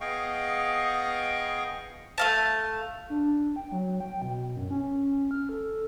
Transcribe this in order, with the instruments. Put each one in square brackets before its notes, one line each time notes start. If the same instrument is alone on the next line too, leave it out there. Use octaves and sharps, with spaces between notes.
[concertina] B3 G#4 D#5 F5 G5 C#6
[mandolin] A3 F5 A5
[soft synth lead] D4
G5
F#3
G5
B2
F#2
C#4
F6
A4